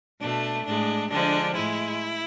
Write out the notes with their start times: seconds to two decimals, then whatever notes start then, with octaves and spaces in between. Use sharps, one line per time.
0.20 B2 A3 D4
0.65 A2 G#3 D4
1.10 D3 F3 G#3 D4
1.54 A2 G#3 E4